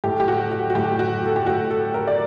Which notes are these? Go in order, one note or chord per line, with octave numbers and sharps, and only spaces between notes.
A2 G4
G4
F#4
F#4
F#4
A2 G4
F#4
A4
G4
A2 F#4
A4
A#4
D5